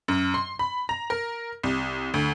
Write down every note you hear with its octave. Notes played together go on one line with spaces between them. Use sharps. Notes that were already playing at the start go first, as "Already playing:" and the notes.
F#2
C6
B5
A#5
A#4
C2
D2